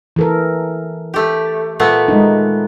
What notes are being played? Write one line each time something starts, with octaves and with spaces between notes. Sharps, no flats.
E3 A4 A#4
A3 G4
A#2 A3 B3
G#3 D#4